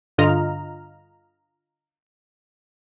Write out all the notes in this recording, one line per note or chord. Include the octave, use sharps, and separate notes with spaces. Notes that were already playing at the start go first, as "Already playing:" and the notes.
G2 D3 F4 D#5 A#5 F6